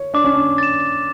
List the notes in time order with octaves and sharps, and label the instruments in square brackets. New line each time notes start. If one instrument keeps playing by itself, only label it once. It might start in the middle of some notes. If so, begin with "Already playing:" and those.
Already playing: [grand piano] C#5
[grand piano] D4 [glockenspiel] D6
[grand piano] C#4
D4
[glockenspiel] A6 E7